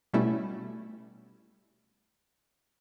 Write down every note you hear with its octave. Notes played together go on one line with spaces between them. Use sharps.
B2 G3 A3 C#4 E4